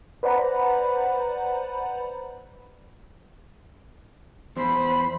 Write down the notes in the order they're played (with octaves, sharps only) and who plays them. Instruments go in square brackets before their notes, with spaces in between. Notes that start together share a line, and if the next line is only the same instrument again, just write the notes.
[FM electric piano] B4 C5 D5 F#5 A#5 B5
[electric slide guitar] E2 [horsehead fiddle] C5 B5